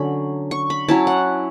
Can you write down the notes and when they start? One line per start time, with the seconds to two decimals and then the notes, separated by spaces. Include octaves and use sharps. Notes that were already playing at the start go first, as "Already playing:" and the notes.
Already playing: D3 F#3 C#4 B5
0.51 C#6
0.70 B5
0.88 F#3 C#4 E4 A5
1.07 F#5